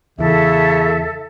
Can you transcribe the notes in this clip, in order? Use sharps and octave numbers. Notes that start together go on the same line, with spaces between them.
E2 C#3 E3 A4 E5